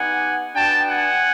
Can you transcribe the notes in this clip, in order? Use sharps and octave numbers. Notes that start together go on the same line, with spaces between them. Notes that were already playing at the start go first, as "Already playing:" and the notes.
Already playing: B3 D#4 G4 F#5 G#5
B3 D4 F#4 G5 A5
F#5 G#5